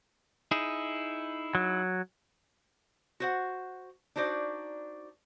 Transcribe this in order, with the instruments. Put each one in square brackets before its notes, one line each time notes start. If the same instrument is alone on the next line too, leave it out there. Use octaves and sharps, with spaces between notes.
[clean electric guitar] D#4 E4 G#4
[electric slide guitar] F#3
[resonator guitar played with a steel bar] F#4 C5 F#5
D4 D#4 F#4 C5 D5